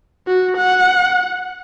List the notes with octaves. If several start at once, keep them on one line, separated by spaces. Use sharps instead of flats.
F#4
F#5